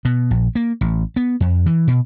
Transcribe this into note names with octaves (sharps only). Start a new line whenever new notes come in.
B2
A#1
A#3
A1
B3
F2
E3
B2